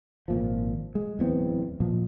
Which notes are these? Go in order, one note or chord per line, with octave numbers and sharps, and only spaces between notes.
G#1 A#2 F3
G#3
D1 E2 B3 C4
A#2 F3